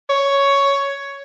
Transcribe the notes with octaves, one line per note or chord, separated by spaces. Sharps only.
C#5